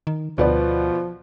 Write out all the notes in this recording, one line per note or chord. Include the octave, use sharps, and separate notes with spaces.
D#3
D2 B2 F3 B3 D5